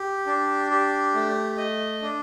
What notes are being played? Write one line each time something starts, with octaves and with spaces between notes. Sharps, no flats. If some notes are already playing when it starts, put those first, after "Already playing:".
Already playing: G4
D4
G4
A3
D#5
D4